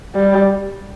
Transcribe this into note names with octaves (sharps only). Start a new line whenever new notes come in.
G3